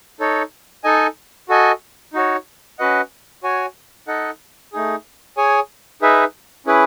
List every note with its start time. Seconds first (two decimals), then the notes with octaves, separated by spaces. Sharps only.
0.20 D#4 A4 C#5
0.84 D#4 A4 D#5 G#5
1.49 F#4 A4 D#5 G#5
2.13 D#4 F#4 C#5
2.79 C#4 F#4 B4 D#5 F#5
3.44 F#4 C#5 G#5
4.08 D#4 A4 D#5 F#5
4.73 A3 D#4 G#4
5.37 G#4 C#5 G#5
6.02 D#4 G#4 B4 E5
6.66 C#4 E4 G#4 B4